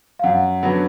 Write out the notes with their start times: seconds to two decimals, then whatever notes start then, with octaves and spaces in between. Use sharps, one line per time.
0.19 F5
0.24 F#2 F#5
0.63 D3 F#3 B3